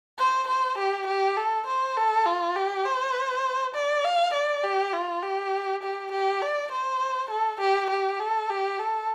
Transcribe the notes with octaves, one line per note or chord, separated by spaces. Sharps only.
C5
C5
G4
G4
A4
C5
A4
F4
G4
C5
D5
F5
D5
G4
F4
G4
G4
G4
D5
C5
A4
G4
G4
A4
G4
A4